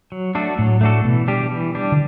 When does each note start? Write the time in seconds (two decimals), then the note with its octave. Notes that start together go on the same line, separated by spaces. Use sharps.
0.12 F#3
0.35 A3 D4 F#4 A4
0.58 A2 F#3
0.81 A3 D4 F#4 A4
1.04 B2 E3
1.28 G3 D4 G4
1.51 E3
1.75 G3 D4 G4
1.92 D3